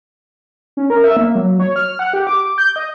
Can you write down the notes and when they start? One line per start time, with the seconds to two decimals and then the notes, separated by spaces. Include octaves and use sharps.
0.77 C#4
0.90 A#4
1.04 E5
1.17 A#3
1.35 F#3
1.60 C#5
1.76 F6
1.99 F#5
2.13 G4
2.27 D6
2.58 G6
2.76 D#5